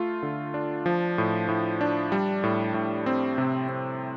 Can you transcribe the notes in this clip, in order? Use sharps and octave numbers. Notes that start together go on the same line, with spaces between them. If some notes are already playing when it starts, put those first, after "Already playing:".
Already playing: A3 F4
D3
D4
F3
A2
A2
D4
G3
A2
A2
C4
C3
C4